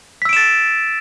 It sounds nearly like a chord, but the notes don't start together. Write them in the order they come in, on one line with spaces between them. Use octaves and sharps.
B6 E6 D7 E7 A6